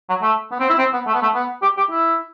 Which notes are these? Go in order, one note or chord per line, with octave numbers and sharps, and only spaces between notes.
F#3
A3
B3
C4
E4
C4
B3
A3
B3
A3
B3
G4
G4
E4